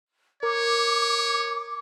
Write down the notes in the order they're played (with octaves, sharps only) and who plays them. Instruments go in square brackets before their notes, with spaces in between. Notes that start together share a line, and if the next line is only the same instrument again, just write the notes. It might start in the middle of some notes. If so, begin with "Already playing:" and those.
[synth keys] A#4 [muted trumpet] C#5 [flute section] D6